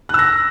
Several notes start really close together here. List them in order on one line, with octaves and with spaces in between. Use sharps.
F#6 E6 A#6